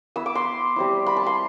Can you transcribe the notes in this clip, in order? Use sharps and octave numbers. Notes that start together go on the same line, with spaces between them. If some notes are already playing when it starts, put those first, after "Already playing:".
B3 E4 E6
D6
C6
G3 C4 E4
B5
A5
C6